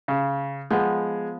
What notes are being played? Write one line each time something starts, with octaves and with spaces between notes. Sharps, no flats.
C#3
F3 G#3 B3